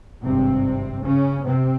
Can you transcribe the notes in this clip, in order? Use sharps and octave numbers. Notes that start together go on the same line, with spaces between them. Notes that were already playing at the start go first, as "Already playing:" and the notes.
G#1 G2 C3 C4
C#3 C#4
C3 C4